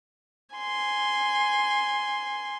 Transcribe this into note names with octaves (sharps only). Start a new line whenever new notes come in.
G#5 C6